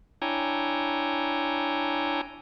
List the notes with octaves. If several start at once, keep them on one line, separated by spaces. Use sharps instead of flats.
D4 E4 C#5 G5 G#5 A#5